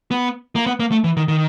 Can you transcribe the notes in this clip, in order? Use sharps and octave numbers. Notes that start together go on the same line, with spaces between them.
B3
A#3
B3
A#3
A3
E3
D#3
D#3